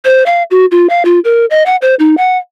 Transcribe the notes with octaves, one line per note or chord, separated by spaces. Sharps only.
C5
F5
F#4
F4
F5
F4
A#4
D#5
F#5
C5
D#4
F#5